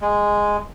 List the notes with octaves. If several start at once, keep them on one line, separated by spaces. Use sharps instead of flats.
G#3